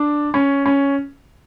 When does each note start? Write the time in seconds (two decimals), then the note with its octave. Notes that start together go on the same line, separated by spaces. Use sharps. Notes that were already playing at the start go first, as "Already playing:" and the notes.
Already playing: D4
0.34 C#4
0.66 C#4